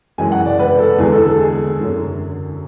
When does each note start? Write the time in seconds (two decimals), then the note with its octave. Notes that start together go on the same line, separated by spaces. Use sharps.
0.18 F#2 E3 G#3 G#5
0.32 F#5
0.46 D5
0.59 B4
0.79 A4
0.98 E2 D3 G#3 G#4
1.12 A4
1.26 A4
1.39 G#4
1.79 F#2 D3 F#3